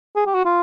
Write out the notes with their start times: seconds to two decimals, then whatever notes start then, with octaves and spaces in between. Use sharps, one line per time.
0.16 G#4
0.26 G4
0.35 F#4
0.45 F4